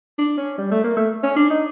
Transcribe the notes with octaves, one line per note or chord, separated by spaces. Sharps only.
D4
C#4
G3
A3
A#3
A3
C#4
D4
D#4